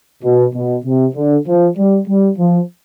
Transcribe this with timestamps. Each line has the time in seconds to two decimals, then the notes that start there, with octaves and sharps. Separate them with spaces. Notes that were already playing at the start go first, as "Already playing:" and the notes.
0.24 B2
0.55 B2
0.85 C3
1.15 D3
1.47 F3
1.77 G3
2.08 G3
2.39 F3